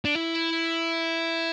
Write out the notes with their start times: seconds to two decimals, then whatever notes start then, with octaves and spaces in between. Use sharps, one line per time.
0.05 D4
0.15 E4